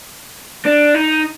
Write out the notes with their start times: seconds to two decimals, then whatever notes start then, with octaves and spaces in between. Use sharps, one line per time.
0.65 D4
0.94 D#4